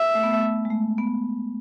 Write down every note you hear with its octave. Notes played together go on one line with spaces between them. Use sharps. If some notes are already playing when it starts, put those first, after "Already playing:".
Already playing: E5
A3
B3
A3
A3
G#3
A3
B3